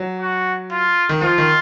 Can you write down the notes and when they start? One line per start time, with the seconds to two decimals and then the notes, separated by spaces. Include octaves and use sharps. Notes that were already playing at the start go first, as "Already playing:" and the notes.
Already playing: F#3
0.20 F#4
0.72 F4
1.09 D#3
1.21 F3 F4
1.38 D#3